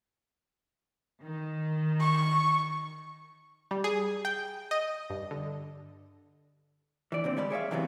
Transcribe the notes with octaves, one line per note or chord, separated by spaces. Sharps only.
D#3
C#6
G3
G#4
G5
D#5
G2
D3
E3 D5
A#2 D3 C4
G3 G#3 D5 B5
G#4 C#5 E5 F5
C3 E3 F#3 G3 B3 C4